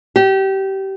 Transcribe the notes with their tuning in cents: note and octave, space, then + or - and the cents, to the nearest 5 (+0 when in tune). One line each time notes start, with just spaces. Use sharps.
G4 -25